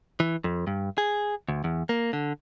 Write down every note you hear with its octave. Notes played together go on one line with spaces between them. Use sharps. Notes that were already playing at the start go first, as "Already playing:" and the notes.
E3
F2
G2
G#4
D2
E2
A#3
D3